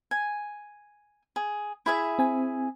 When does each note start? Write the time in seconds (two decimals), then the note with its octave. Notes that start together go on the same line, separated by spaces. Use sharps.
0.11 G#5
1.36 G#4
1.86 E4 G#4 E5
2.19 C4 G#5